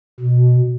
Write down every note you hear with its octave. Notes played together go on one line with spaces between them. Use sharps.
B2